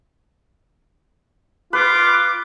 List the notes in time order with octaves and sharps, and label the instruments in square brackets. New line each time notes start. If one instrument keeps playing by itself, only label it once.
[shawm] F4 [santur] B4 [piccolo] D6